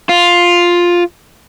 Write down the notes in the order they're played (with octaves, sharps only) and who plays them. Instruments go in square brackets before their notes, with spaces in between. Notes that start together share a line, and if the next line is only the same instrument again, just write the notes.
[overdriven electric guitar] F4